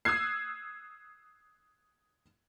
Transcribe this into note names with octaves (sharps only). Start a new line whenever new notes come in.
D#6 E6 F#6 G#6 C7